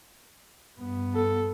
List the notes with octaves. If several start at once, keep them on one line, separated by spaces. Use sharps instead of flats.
G2 B3
A4